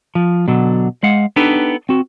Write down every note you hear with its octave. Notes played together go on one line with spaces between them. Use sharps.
F3
B2 D3 F#3
G#3 F5 F#5
B3 D4 D#4 G4 A4 B4
C4 F#4